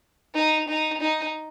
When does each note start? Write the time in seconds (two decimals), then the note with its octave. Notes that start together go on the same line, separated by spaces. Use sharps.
0.35 D#4
0.68 D#4
1.01 D#4